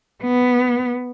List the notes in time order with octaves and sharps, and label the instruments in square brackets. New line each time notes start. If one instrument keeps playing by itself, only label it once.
[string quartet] B3